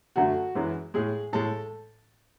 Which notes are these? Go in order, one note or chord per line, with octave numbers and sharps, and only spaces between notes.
F#2 D3 A3 F#4
F#2 E3 G#3
A2 G#3 G#4
A2 G#3 A4